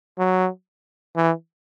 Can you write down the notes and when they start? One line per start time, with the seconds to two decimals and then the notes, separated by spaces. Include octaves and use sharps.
0.19 F#3
1.16 E3